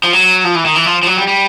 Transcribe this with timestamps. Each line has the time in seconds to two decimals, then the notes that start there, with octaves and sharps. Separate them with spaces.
0.04 F3
0.13 F#3
0.44 F3
0.55 E3
0.65 D#3
0.76 E3
0.86 F3
1.03 F3
1.07 F#3
1.17 G3
1.27 G3